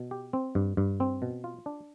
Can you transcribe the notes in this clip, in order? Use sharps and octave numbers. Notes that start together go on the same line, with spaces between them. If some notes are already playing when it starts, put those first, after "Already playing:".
Already playing: B2
G4
C4
G2
G2
C4
B2
F4
D4